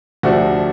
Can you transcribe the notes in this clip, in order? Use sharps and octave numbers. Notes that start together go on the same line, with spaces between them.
D2 C3 F3 A3 D4 F#4